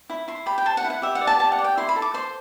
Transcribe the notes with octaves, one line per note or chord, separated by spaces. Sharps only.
E4
E4 C6
G4 B5
G5
C5 A5
F#5
E4
F#5
G4 E5
F#5
D5
A5
G4 A5
F#5
D5
G5
E4 C6
B5
A4
D6
C5 C6